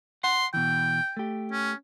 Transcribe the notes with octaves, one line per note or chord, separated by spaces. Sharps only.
F#5 C6
B2 E3 G5
A3 G4
C#4